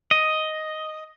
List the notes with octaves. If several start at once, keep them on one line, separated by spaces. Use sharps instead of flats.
D#5